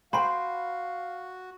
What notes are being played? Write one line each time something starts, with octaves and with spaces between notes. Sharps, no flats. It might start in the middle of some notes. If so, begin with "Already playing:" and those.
F#4 C5 F5 G5 B5